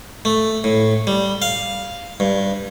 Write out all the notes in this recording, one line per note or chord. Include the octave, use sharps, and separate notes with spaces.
A3
A2
G3
F5
G2